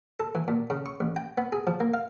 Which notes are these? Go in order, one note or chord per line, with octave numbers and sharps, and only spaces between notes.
A4
E3
A#2
C#3
C#6
A1
G5
B3
G#4
F3
A#3
F5